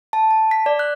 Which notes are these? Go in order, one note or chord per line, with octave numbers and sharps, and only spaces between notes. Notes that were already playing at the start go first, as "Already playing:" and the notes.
A5
A5
B6
D5
F#6